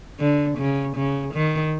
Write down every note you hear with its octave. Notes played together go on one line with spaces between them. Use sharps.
D3
C#3
C#3
D#3